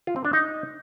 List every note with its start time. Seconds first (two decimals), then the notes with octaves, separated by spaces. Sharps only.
0.07 F4
0.16 C4
0.25 D4
0.33 D#4